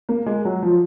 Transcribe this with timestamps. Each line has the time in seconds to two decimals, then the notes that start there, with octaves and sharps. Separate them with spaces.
0.09 A#3
0.26 G#3
0.45 F#3
0.62 F3